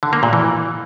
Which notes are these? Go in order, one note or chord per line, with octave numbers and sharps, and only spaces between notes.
D3
A#3
A#2
E3